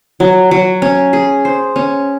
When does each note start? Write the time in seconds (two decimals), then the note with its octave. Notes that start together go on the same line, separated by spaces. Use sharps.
0.20 F#3
0.51 F#3
0.82 C#4
1.13 G#4
1.45 C5
1.76 C#4